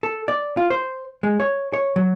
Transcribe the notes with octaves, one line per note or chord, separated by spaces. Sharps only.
A4
D5
F4
C5
G#3
C#5
C#5
F#3